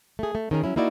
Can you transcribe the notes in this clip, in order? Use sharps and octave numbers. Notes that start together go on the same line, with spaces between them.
A3 G#4
A3
D#3 C#4 G#4 A#4
F#3 C#4 E4
A#3 D#4 E4 F#4 D5